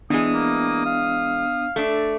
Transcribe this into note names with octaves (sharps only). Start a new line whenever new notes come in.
E3 G#3 B3 D4 D#6
A#3
F5
A3 D4